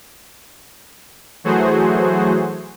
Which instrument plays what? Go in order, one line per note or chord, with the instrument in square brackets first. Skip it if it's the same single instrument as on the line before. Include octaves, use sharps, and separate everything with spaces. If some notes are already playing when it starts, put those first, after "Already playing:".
[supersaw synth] E3 F#3 A3 F#4 G#4 C5